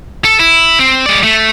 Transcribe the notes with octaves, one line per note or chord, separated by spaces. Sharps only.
A4
E4
C4
G#3 D5
A3